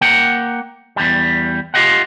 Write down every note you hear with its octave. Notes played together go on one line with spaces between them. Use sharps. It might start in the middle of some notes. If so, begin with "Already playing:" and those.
A#3 F#5 G5
E2 G3
F4 G4 A4 D#5 F5 F#5